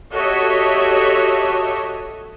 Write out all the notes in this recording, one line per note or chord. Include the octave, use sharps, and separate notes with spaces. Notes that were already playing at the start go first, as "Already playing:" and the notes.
F#4 G4 A4 C#5 D#5 E5